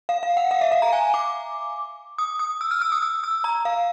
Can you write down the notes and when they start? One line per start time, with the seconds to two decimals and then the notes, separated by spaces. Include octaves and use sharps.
0.09 F5
0.23 F5
0.37 F#5
0.51 F5
0.61 E5
0.72 F5
0.82 A#5
0.93 G#5
1.14 D6
2.18 D#6
2.39 D#6
2.61 E6
2.71 F6
2.81 E6
2.92 D#6
3.02 E6
3.24 E6
3.44 A#5
3.65 F5